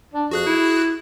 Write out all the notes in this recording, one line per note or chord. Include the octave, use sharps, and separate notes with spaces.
D4
F2 F#4 G#4 F#6
E4